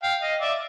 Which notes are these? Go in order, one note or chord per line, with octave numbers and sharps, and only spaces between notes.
F5 G5
D#5 F5
D5 E5